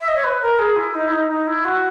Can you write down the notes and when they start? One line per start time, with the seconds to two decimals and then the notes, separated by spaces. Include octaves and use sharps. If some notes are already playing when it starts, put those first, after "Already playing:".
0.01 E5
0.08 D#5
0.15 C#5
0.24 B4
0.42 A#4
0.59 G#4
0.76 E4
0.95 D#4
1.07 E4
1.12 D#4
1.30 D#4
1.47 E4
1.65 F#4